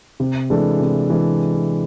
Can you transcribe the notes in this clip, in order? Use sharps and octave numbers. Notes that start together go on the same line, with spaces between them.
C3
E3 G#3 D4 A4
C3
E3 G#3 D4